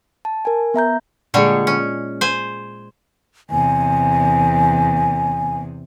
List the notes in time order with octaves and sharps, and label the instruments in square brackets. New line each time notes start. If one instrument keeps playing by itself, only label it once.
[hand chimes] A5
A#4 G#5
B3 E5 A#5 G6
[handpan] A#2 G#3 G#4 [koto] D3 G3 C#5
[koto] C#4
C5 G#5
[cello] E2 C3 [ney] G#5